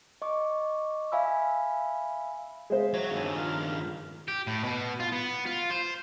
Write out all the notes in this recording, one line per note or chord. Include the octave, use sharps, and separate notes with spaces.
D#5 C#6 D6
E5 F5 G#5 B5 E6
G#3 C5 E5 F5
F#3 C#5
G2 D#3 C#5 G#5 E6
F4 A#4 F6
G4
A2
B2
F4
B3
F4
C5